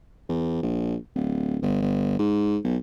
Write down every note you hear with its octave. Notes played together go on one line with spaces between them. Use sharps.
E2
A#1
D1
G1
G1
G#2
B1